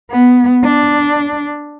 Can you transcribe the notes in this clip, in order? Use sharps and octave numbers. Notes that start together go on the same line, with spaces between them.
B3
D4